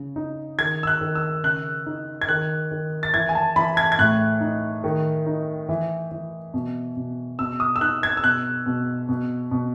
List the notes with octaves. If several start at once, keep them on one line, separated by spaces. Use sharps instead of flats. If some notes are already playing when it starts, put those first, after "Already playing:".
Already playing: C#3
D#4
D#3 G#6
E6
F#6
D#3
E6
C#3 F#6
D#4
G#6
D#3 F#6
D#3
A6
E3 G#6
G#5
A5
E3 B5
G#6
G#6
A2 F#6
D#4
D#3
D#4
E3
E3
B2
B2
B2 E6
D#6
E6
D#4 F#6
G#6
E6
B2 F#6
B2
B2
B2